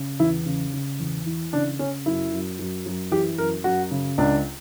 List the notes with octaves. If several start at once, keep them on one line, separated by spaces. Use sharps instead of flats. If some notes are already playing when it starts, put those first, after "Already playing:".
Already playing: C#3
E2 E4
C#3
C#3
E2
E3
C#3 D4
C#3 C#4
F#2 E4
F#2
F#2
F#2
E3 G4
F#2 A#4
F#2 F#4
C#3
C#2 D4